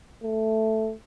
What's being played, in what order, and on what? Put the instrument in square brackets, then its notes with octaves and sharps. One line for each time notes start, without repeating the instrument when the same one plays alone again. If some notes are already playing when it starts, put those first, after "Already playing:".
[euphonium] A3